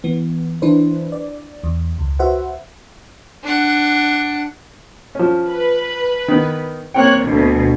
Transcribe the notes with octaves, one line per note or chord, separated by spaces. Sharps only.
E3 B3
E3 D4 E4 B4 C5
D5
E2
C#2
F#4 B4 C5 E5 F#5
D4 F#5
F3 C#4
B4
D#3 B3
A#3 C4 C#5 G5 F#6
D2 B2